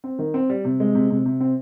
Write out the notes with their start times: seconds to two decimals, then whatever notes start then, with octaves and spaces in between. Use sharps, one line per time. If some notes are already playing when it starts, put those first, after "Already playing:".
0.04 C4
0.19 D#3
0.34 C4
0.50 G3
0.65 C3
0.80 G#3
0.95 C3
1.10 C3
1.26 C3
1.40 C4